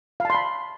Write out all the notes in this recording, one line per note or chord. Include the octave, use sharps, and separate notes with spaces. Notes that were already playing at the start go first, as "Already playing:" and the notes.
F5 A5 B5 C6